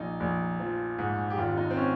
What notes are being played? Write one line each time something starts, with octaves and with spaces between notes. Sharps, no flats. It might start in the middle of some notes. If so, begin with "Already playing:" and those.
Already playing: A#1 D#4
A#1
F3
G#2
G4
G#1 F4
D#4
C4
C#4